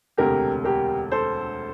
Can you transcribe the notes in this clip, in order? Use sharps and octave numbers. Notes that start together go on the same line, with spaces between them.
E1 D2 C3 G4 A#4
G4 A#4
A4 C5